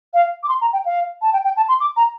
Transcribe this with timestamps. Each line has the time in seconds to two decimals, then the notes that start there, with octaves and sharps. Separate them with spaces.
0.14 F5
0.43 D6
0.49 C6
0.61 A#5
0.73 G5
0.85 F5
1.22 A5
1.33 G5
1.44 G5
1.57 A5
1.68 C6
1.80 D6
1.96 A#5